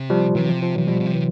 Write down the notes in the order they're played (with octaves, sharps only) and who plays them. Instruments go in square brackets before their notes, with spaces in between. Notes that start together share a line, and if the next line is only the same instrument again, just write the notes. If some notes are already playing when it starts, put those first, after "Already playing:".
Already playing: [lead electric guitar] C3
[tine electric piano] F3 G3
[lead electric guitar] C3 [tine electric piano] E3 F#3
[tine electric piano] F3
F3
[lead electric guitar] C3 [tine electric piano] E3 F#3
[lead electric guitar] B2 [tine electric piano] F3 G3
[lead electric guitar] B2
C3
[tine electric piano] E3 F#3